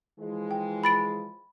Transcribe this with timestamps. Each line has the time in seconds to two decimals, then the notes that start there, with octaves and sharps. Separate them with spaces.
0.19 E3 F3 G#3
0.51 G5
0.84 B5 A6 D7